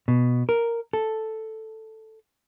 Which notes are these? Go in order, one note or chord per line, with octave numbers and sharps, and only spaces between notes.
B2
A#4
A4